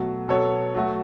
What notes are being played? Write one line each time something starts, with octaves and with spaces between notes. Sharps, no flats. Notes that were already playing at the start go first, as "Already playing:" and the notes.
Already playing: B2 F#3 A3 F#4
B2 F#3 B3 A4 C#5
F#3 A3 F#4